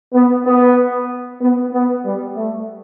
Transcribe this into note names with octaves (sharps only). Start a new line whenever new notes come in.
B3
B3
B3
B3
G3
A3